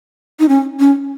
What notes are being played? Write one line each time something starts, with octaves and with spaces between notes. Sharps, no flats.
D#4
C#4
C#4